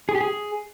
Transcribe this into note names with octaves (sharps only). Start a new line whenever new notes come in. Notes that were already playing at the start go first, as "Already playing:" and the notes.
G#4
G4
G#4